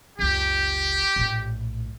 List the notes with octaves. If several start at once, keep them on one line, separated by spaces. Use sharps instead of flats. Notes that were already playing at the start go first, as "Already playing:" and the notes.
F#1 C#2 G4
A#1 A2